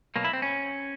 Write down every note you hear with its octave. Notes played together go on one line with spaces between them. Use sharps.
B2 F#3 A#3
E4
C4
C#4